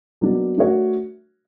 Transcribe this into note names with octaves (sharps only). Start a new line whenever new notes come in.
B2 F#3 A#3 D4
A3 D4 F#4 A#4 C#5